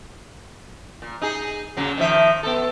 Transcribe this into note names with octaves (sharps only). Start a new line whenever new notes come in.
A#2
D#4 G#4
A#2 C#3 F#3
D#3 F3 E5
B3 A4